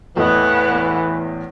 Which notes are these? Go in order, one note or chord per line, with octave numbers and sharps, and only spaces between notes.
E2 A2 E3 B3 A4 D#5